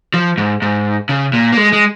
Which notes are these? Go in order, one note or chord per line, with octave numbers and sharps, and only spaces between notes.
F3
G#2
G#2
C#3
A#2
A#3
G#3
G#3